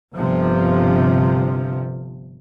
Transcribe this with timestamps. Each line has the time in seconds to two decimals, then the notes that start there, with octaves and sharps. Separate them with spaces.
0.15 G1 C3 F3